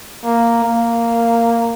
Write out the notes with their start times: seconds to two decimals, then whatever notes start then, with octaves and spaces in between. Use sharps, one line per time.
0.24 A#3
0.64 A#3